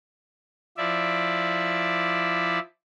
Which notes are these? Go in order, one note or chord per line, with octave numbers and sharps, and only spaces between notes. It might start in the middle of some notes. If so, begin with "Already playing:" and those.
F3 E4 D5 E5